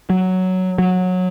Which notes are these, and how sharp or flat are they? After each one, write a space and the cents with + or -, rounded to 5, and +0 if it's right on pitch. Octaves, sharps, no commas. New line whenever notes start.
F#3 +5
F#3 -15